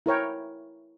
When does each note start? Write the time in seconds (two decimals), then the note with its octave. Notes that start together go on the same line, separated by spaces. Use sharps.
0.06 E4 A#4 C#5 G5